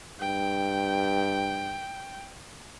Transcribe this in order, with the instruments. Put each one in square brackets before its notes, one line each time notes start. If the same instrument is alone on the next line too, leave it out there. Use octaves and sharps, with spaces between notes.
[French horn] G2 [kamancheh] G5